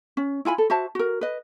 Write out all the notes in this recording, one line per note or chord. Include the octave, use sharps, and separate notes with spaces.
C#4
E4 F4 G#5 B5
A4
F#4 C5 E5 A5
F#4 A#4
B4 D#5